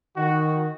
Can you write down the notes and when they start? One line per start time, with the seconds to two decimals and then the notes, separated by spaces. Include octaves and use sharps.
0.16 D#3 F#4